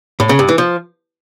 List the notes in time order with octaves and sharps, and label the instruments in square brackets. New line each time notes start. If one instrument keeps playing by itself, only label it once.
[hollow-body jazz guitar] A2
C#3
G2
E3
F3